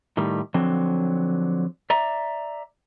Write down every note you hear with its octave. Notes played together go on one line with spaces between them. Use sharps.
A2 D#3 G3
D3 F3 F#3 C4
D5 E5 A#5